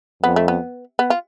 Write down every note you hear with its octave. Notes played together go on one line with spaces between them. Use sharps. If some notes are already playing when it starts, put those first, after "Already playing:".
F2 B3
A3
B3
B3
F4